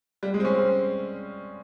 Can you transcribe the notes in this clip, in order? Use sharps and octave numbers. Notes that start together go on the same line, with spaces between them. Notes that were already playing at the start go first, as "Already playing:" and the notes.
G3
G#3
C4
C#4
C4